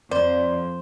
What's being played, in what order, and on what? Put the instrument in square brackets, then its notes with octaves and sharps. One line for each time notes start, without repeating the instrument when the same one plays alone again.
[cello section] F2 [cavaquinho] C5 [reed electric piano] D5